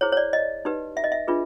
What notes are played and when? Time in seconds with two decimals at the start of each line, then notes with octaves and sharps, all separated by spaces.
0.01 E4 G#4 C5 C#5
0.12 C#5
0.17 D5
0.33 D#5
0.65 D#4 G4 B4
0.97 E5
1.04 D#5
1.12 E5
1.28 D4 F4 G#4 B4